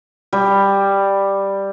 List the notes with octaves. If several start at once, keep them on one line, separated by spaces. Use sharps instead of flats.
G3